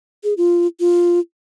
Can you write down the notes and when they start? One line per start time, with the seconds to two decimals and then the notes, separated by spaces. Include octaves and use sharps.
0.24 G#4
0.37 F4
0.80 F4